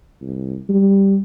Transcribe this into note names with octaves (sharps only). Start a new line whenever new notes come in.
C2
G3